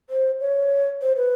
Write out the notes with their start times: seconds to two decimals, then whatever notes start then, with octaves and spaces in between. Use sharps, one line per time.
0.10 C5
0.40 C#5
1.02 C5
1.17 B4